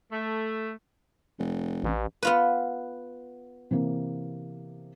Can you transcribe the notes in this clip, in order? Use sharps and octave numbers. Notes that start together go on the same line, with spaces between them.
A3
F1
A1
B3 F4 B4
C3 E3 A#3